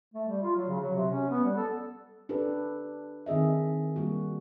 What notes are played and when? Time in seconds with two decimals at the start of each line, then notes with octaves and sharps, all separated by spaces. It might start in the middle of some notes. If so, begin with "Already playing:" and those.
0.14 A3
0.28 G3
0.42 F4
0.56 F#3
0.68 C#3
0.80 F#3
0.96 C3
1.11 C#4
1.30 B3
1.44 G3
1.56 A4
2.29 D4 G4 A4 B4
3.26 D#3 C4 G#4 D#5 E5
3.96 G3 A#3 F#4